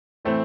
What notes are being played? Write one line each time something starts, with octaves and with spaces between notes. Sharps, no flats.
A2 E3 A3 C4